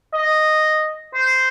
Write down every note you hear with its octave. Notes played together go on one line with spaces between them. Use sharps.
D#5
C5